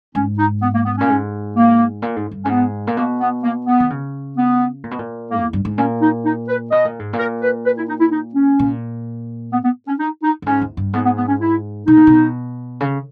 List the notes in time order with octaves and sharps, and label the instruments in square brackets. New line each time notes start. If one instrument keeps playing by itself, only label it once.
[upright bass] G#2 [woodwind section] C#4
[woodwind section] D#4
B3
A#3
B3
[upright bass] A#2 [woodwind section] C#4
[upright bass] G#2
[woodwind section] A#3
[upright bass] A#2
G#2
G2
[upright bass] G#2 [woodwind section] B3 C#4
[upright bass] A#2
[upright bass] B2 [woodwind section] A#3
[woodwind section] B3
A#3
B3
[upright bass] D#3
C#3
[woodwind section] B3
[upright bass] A#2
B2
A#2
[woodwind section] A#3
[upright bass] E2
G2
G#2
[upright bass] A#2 [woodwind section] C#4
[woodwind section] D#4
D#4
B4
[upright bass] B2 [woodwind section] D#5
[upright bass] A#2
G#2
A#2
[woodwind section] A#4
B4
B4
E4
D#4
E4
D#4
C#4
[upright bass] A#2
[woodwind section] B3
B3
C#4
D#4
D#4
[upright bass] G2
[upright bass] G#2 [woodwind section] C#4
[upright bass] E2
G2
[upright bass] G#2 [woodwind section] B3
[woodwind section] B3
B3
C#4
E4
[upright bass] B2 [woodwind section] D#4
[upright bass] A#2
B2
C#3